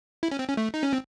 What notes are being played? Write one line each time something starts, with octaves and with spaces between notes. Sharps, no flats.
E4
C#4
C4
C#4
A3
D#4
C#4
C4